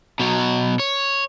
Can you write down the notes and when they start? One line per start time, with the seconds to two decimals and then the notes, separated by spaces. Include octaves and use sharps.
0.19 B2 F#3
0.79 C#5